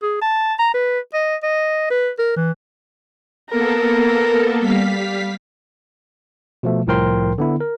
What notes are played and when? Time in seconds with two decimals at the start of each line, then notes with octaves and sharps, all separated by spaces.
0.03 G#4
0.22 A5
0.59 A#5
0.74 B4
1.14 D#5
1.43 D#5
1.91 B4
2.19 A#4
2.37 E3
3.50 A#3 B3 A4 A#4
4.60 G3 F5 B6
6.63 B2 F3 A3
6.87 C2 A2 F3 A#4 G5 C6
7.38 D3 B3 E4
7.60 A#4